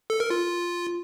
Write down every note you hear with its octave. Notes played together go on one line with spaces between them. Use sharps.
A4
A#4
F4